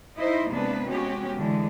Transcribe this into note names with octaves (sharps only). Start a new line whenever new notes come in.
D#4 E4 C5 D#5
C3 G#3 A#3 B3 D4 B4
G#3 B3 C#4 F#4 G4
D3 E3 G#3